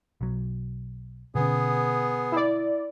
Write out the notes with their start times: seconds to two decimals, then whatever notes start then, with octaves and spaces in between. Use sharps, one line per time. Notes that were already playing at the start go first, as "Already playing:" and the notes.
0.21 B1 F#3
1.35 B2 D3 B3 C#4 G#4
2.32 E4 D5